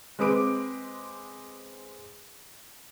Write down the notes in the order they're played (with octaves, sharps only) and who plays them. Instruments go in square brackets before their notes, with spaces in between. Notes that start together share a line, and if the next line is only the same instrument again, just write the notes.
[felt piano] G#3 C4 G#4 B4 D6 D7